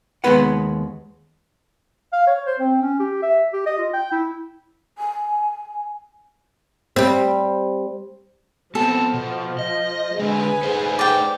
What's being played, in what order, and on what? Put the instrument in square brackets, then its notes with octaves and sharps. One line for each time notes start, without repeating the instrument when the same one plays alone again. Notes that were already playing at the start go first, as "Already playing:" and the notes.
[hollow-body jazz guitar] D#2 E3 G#3 B3 B4 F#5
[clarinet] F5
C#5
C5
C4
C#4
G4
E5
G4
D#5
F4
G5
E4
[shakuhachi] G#5
[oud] G3 C4
[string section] F3 [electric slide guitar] B3 C4 [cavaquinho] A4
[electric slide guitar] B2
D#5
[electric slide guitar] D3 G#3 [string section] G#4 B4 G#5
[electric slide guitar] A3 D#4 C5
[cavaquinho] D5 G5